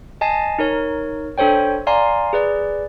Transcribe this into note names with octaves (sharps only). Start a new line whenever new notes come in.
D#5 G#5 A5 A6 C7
D#4 A#4 C#5
D4 A4 C5 C#5 G5
D5 F5 G#5 A#5 C6
G#4 B4 D5